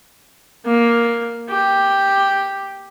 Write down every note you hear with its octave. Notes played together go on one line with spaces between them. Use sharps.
A#3
G4